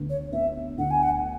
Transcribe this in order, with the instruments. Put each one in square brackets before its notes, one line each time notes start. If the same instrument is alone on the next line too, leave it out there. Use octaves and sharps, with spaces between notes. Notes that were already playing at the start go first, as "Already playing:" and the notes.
Already playing: [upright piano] D2 B3
[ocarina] C#5
[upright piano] B3 [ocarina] E5
[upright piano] D2 [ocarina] F#5
[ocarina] G#5
F#5